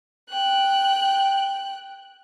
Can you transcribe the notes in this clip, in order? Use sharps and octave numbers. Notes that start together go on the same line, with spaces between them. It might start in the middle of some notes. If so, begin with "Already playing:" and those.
G5 F#6